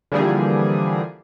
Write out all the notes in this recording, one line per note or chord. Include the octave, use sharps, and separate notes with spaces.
D3 E3 F3 G3 A#3 G#4